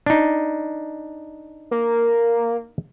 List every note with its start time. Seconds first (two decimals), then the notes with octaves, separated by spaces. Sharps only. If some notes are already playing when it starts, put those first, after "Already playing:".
0.06 D4 D#4
1.71 A#3